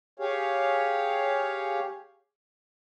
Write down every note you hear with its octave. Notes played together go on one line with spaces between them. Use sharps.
G4 G#4 C#5 F5